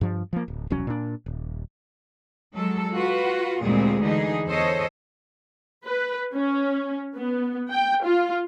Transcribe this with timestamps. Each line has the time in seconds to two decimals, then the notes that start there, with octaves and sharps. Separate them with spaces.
0.01 G2 F3
0.33 F3 A#3
0.48 D1
0.70 E1 C2 F#3 C#4
0.87 A#2 D4
1.26 D#1
2.55 F#3 G#3 A4
2.94 F4 F#4 B4
3.61 D2 A#2 G3 G#3 C4 G#4
4.01 D3 E3 D#4 G#4
4.47 E2 A4 C5 C#5 D#5
5.85 B4
6.34 C#4
7.16 B3
7.71 G5
8.04 F4